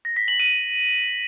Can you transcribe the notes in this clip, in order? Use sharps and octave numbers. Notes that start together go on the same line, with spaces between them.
A#6
B6
F#7
D#7